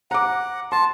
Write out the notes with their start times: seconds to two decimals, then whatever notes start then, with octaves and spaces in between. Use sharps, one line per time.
0.11 F#5 A#5 D6
0.72 A5 C6